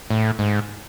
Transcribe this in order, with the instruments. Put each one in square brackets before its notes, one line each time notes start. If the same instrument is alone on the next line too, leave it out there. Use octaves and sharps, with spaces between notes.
[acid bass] A2
G#2